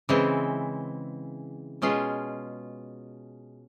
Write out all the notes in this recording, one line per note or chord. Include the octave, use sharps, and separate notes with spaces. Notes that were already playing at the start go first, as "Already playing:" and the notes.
C#3 E3 G#3 C4 E4
B2 G#3 C#4 F4 G#4